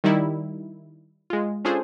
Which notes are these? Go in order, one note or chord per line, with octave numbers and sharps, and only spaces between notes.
D#3 G3 D#4 E4
G#3 F4
C#4 D4 F4 G#4 A4 C5